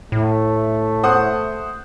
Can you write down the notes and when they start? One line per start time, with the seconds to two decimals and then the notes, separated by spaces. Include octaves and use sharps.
0.12 A2 A3
1.04 C5 F#5 D#6